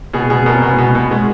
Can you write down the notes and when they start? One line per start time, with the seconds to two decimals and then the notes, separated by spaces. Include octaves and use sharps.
0.14 B2 G#4
0.30 B2 G#4
0.46 B2 A#4
0.62 B2 G#4
0.78 B2
0.95 B2
1.11 G#3